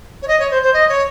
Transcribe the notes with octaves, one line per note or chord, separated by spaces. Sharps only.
C#5
D#5
C#5
C5
C5
D#5
C#5